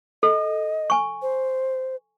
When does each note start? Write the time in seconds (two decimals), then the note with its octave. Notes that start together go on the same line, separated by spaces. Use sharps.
0.23 A4 D#5
0.90 G#5 C#6
1.22 C5